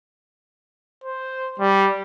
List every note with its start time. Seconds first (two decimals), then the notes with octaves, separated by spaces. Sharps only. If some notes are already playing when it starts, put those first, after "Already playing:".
1.04 C5
1.60 G3